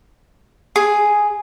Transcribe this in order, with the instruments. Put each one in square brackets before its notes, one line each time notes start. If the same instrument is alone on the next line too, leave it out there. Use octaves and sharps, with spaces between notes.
[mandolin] G#4 [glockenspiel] G#5